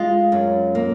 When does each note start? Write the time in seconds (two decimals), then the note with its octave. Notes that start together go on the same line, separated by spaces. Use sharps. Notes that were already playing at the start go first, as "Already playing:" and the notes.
Already playing: G#3 F4
0.32 F#2
0.75 A#3